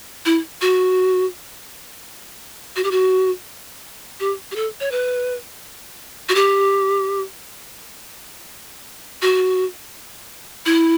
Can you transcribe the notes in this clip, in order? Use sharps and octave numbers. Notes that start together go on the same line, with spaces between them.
E4
F#4
F#4
G4
F#4
G4
G4
A4
C#5
B4
F#4
G4
F#4
E4